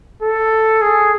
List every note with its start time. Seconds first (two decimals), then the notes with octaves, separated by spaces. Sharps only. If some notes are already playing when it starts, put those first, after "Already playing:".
0.23 A4
0.81 G#4